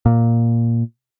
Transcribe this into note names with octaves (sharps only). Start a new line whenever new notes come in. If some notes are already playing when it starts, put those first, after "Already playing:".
A#2